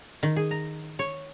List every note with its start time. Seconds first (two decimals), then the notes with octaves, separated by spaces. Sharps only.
0.23 D#3
0.36 G#4
0.51 A#5
0.99 C#5